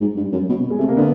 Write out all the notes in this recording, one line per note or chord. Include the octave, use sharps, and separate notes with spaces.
G#2
G2
F#2
B2
G#3
C3 A3
A#3
D3 B3